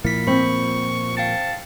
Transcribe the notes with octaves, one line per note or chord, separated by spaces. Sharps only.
A#2 F3 A#3 E4 B6
C4 B5 C#6
F5 G5 A5 C#7